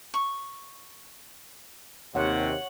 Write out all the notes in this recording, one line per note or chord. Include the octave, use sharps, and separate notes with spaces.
C#6
D#2 C3 C#5 F#5